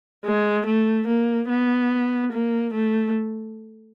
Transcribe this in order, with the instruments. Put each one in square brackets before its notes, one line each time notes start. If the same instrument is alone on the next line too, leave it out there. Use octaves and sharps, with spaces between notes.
[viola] G#3
A3
A#3
B3
A#3
A3